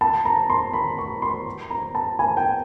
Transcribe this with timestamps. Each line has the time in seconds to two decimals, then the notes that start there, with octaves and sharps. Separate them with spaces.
0.01 A5
0.25 A#5
0.50 C6
0.73 B5
0.98 C#6
1.22 C6
1.70 A#5
1.95 A5
2.19 G#5
2.37 G5